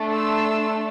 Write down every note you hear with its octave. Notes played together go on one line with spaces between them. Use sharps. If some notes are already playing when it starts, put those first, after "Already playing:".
Already playing: A3 D4 A4
C6 E6